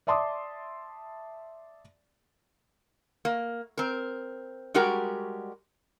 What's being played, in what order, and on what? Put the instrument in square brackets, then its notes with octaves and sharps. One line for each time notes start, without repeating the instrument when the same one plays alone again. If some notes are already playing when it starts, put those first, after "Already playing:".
[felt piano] D5 E5 A5 C6 D6 D#6
[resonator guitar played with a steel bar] A#3
C4 A#4
G3 G#3 F#4 G4 A#4